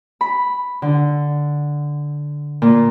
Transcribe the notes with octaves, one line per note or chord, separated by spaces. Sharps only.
B5
D3
A#2